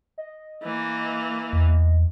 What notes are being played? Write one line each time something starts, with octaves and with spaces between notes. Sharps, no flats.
D#5
E3 A#3
E2